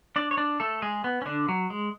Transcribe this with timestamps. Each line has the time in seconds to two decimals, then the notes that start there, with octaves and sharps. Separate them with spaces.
0.16 D4 D5
0.31 C#5
0.37 D4 D5
0.60 A3 A4
0.82 G#3 G#4
1.04 B3
1.22 C#4
1.26 D3 D4
1.49 F#3
1.70 G#3